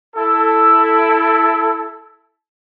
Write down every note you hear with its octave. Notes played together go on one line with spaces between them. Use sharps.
E4 A4